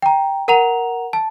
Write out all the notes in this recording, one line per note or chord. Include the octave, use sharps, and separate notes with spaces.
G5 A#5
A#4 F#5 A#5 F7
A5